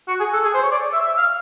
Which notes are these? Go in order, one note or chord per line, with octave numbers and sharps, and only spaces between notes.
F#4
G#4
A4
G#4
C5
C#5
D5
E5
E5
F5